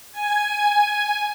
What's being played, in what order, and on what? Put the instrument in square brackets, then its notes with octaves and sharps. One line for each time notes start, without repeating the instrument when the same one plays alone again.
[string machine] G#5